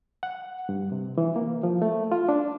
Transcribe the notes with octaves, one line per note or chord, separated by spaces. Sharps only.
F#5
G2
C3
E3
A#3
F3
A3
F4
D4